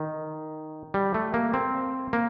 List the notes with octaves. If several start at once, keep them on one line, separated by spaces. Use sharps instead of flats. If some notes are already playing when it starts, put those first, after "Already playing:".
Already playing: D#3
G3
A3
A#3
C4
A#3